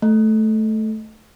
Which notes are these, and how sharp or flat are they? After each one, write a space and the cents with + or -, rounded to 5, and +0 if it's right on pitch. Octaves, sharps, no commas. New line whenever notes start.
A3 -10